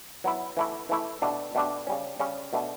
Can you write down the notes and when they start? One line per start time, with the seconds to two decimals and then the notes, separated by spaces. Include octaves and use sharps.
0.24 F#3 B3 E4
0.57 E3 A3 E4
0.89 E3 A3 E4
1.22 B2 A3 D4 G4
1.55 B2 A3 D4 G4
1.87 C#3 G3 C#4
2.20 C#3 G3 C#4
2.53 B2 A3 D4